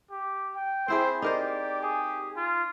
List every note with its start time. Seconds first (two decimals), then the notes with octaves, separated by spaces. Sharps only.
0.11 G4
0.56 G5
0.88 C4 E4 G#4 C5
1.22 D#4 G4 A#4 C5 D5
1.82 G#4
2.36 F4